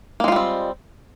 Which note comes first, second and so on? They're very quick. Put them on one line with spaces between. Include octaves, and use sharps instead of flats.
A#3 G#3 F4 G3 C4